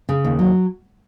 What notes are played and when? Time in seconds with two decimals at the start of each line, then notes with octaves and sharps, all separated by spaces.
0.09 C#3
0.25 D#2
0.39 F#3